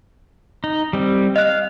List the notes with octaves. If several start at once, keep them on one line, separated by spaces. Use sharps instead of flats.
D#4
G3 C4
D#5 F5 F#6